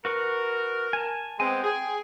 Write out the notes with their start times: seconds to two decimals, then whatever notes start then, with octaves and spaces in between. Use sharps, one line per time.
0.05 F#4 A#4 B4 C#6
0.93 G#5 A5
1.40 G#3 B3 C4 G5 G#5
1.64 G#4